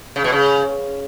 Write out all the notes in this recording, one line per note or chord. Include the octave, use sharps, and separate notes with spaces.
C#3
B2
C#3